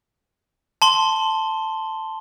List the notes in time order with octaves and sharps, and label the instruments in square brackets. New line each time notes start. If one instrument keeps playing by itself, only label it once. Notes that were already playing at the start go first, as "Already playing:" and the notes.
[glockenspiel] A5 C6 G7